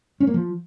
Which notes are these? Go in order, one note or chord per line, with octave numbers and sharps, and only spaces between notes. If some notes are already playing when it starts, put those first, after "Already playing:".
C#4
A#3
F3